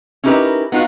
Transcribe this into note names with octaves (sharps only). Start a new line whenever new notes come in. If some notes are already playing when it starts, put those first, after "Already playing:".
C#4 D#4 E4 G4 A#4 B4
B3 D#4 F4 F#4 F5